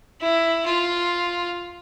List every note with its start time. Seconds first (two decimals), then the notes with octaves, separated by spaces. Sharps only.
0.21 E4
0.66 F4